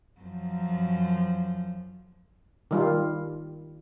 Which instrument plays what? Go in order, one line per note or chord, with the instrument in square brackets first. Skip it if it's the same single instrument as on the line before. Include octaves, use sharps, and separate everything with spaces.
[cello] F#2 F3
[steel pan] D#3 G3 F4